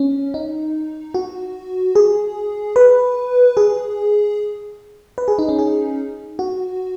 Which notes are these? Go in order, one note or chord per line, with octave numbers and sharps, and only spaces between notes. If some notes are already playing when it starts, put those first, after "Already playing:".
Already playing: C#4
D#4
F#4
G#4
B4
G#4
B4
G#4
D#4
C#4
G#4
F#4